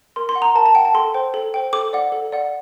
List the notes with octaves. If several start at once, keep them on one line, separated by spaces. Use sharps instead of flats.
A#4 C6
C6
F#5
A#5
A#4 A5
A5
F#5 G5
A5
A4 C6
C5 G5
A4
C5 G5
A4 D6
D5 F#5
A4
D5 F#5